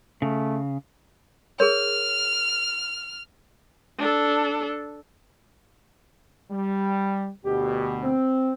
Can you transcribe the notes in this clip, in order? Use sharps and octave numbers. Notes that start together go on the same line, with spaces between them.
C#3 A3
G#4 A#4 C#5 F6
D4 A4
G3
D2 B2 G4
C4